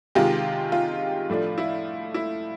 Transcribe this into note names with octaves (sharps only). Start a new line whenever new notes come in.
C3 D#3 G#3 F4 G4
F4
A2 F3 A3 D4
E4
E4